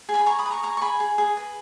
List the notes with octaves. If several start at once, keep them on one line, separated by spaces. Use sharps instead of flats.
G#4
G#5 B5
G#4 A#5 C#6
B5 D#6
B4
A#5 C#6
G#4 A#5 C#6
C#6
G#4 G#5 B5
G#4
G#4
B4